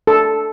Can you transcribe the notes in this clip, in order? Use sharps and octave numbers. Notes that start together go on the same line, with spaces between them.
A4